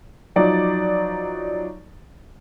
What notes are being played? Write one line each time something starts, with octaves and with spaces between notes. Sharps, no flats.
F3 F#3 D#4 D5